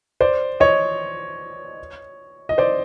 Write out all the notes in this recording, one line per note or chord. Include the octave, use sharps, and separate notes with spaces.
C5 D5
C#5 D#5
D#5
C5 D5